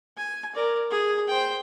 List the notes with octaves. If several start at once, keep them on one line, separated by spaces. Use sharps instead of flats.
G#5
A#4 D5
G#4
C5 G5